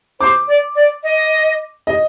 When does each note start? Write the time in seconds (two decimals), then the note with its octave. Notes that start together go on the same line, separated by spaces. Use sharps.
0.20 C5 D6
0.48 D5
0.76 D5
1.03 D#5
1.87 D#5